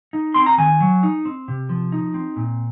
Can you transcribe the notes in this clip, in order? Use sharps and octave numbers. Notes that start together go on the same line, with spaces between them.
D#4
C4 C6
A#5
D#3 G#5
F#3
D#4
C4
C3
F3
D#4
C4
A#2